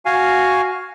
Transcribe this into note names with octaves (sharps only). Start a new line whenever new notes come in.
F#4 F5 G#5